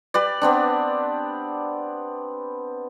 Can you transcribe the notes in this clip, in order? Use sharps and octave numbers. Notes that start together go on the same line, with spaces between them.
G4 B4 D5
B3 C4 D4